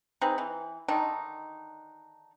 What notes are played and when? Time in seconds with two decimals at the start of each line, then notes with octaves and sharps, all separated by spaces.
0.21 C4 D#4 G#4 B4
0.38 E3
0.88 D3 D#3 D4 D#4